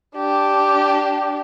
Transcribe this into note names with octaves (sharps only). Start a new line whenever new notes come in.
D4 G4